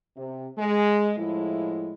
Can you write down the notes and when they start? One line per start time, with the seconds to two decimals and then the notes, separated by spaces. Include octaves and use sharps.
0.16 C3
0.58 G#3
1.18 A2 F3 G#3 E4